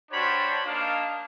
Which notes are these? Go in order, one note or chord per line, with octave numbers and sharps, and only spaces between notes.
G3 D4 F#4 C5 C#5 B5
A#3 D4 D#4 F5